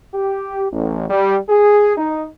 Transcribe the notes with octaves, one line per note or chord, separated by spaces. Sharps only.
G4
A1
G3
G#4
D#4